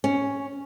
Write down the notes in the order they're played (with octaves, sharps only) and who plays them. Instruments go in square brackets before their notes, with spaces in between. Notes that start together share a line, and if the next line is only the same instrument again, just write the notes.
[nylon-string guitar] C#4